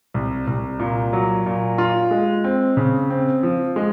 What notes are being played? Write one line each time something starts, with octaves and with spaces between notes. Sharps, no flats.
C2
C2
A#2
F#3
A#2
F4
G#3
C4
C#3
C4
F3
G#3